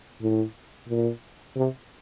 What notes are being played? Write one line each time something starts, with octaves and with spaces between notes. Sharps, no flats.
A2
A#2
C3